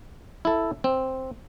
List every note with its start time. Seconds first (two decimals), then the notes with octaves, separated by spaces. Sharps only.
0.45 E4 A4
0.84 C4